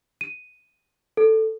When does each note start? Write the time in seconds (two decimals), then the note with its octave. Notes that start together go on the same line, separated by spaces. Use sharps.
0.21 D#7
1.17 A4